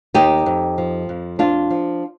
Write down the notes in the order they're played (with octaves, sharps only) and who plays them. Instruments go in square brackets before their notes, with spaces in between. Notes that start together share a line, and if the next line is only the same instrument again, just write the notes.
[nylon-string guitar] D#2 D#4 G4
F2
F3
F2
F2 D4 F4
F3